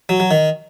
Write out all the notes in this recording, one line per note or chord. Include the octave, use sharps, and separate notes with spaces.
F#3
F#3
D#3